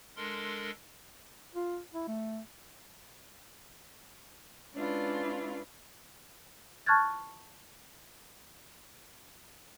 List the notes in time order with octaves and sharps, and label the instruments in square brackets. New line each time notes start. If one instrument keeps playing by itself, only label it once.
[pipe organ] G#3 D4 A4 A#4 C6
[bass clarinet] F4
E4
A3
[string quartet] G#3 C#4 D4 E4 F4 B4
[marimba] A5 C#6 F6 F#6 G#6 A6